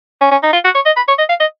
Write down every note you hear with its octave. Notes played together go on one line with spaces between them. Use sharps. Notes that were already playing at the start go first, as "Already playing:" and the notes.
C#4
C#4
D#4
F4
F#4
C#5
D#5
B5
C#5
D#5
F5
D#5